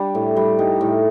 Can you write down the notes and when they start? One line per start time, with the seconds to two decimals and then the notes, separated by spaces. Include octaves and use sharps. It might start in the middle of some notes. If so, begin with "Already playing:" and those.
Already playing: G3 D4
0.15 A2
0.36 G3
0.59 G3 D#4
0.81 A2